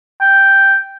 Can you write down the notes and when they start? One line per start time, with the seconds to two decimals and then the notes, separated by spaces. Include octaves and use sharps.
0.21 G5